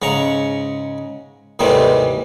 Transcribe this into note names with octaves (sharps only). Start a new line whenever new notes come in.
G#2 C#3 A#5 C#6
D#2 G#2 C3 E3 G3 A3